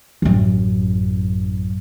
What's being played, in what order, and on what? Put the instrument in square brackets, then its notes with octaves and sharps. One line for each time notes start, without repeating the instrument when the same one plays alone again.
[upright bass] A1 F#2